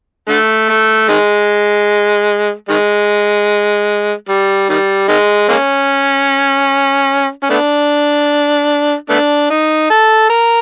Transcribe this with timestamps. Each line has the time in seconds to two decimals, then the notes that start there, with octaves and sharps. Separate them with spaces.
0.28 D3 A3
0.69 A3
1.09 D#3 G#3
2.69 D#3 G#3
4.29 G3
4.69 D#3 G3
5.09 D#3 G#3
5.49 G#3 A#3 C#4
7.43 C#4
7.50 A3 B3 D4
9.10 A3 B3 D4
9.50 D#4
9.90 A4
10.30 A#4